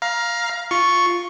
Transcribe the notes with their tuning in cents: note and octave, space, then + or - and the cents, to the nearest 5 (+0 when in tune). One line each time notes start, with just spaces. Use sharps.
F5 +0 A#5 +20
F4 +0 C#6 +0